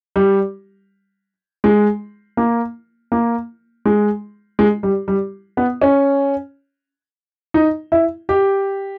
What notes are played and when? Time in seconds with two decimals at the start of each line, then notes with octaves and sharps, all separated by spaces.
0.16 G3
1.64 G#3
2.37 A#3
3.12 A#3
3.85 G#3
4.59 G#3
4.83 G3
5.08 G3
5.57 B3
5.82 C#4
7.54 D#4
7.92 E4
8.29 G4